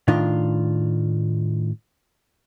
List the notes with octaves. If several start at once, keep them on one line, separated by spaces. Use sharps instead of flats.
A2 D#3 D4 F4